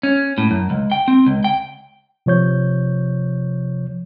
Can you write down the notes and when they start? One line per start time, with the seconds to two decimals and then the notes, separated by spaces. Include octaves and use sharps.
0.03 C#4
0.38 A2
0.51 F#2
0.70 C#2
0.92 G5
1.08 C4
1.26 C#2
1.44 G5
2.26 C3 F3 C#5 G6